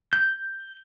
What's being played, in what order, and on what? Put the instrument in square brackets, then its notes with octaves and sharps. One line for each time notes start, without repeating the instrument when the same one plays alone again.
[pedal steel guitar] G6